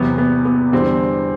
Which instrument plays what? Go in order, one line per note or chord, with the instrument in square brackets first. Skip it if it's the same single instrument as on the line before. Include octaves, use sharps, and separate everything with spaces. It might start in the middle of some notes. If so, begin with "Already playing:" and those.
Already playing: [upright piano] E2 C3 F#3 B3
B3
B3
E2 D3 G3 C4